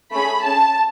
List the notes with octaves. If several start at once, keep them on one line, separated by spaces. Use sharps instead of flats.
A3 C#4 G#4 B5
C#4 G#4 A5